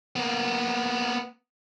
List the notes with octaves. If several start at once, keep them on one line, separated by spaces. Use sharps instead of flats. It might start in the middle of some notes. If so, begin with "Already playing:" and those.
A#3 B3